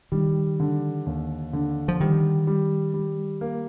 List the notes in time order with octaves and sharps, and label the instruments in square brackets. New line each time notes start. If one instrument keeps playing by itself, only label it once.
[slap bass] D#3 [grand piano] G3
[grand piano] D3
D#2
D3
[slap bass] F3
[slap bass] D#3 [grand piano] G3
[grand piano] G3
G3
A#3